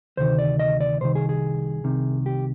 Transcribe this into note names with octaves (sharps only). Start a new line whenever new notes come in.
D2 C3 D#3 C5
D5
D#5
D5
C2 C3 D#3 C5
G#4
G#4
C2 C3 D#3
G4